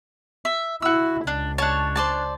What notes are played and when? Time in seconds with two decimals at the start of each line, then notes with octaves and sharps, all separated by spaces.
0.45 E5
0.82 E4 F#4 E6
1.27 C#2 D4
1.58 D4 C#5 A5
1.96 C5 D5 A5